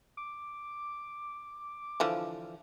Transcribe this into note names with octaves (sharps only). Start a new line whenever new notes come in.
D6
D3 E3 F3